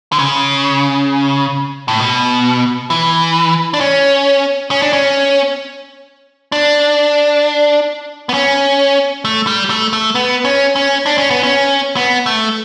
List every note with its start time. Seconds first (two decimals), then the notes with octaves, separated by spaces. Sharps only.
0.12 D3
0.19 C#3
1.88 A2
2.00 B2
2.90 E3
3.74 D4
3.81 C#4
4.71 C#4
4.82 D4
4.93 C#4
6.52 D4
8.29 B3
8.34 C#4
9.25 A3
9.47 G3
9.70 A3
9.93 A3
10.15 B3
10.45 C#4
10.76 C#4
11.06 D4
11.18 C#4
11.30 B3
11.43 C#4
11.96 B3
12.26 A3